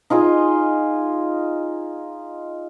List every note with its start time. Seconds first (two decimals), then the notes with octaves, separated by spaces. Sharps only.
0.10 D#4 F4 G#4 D#5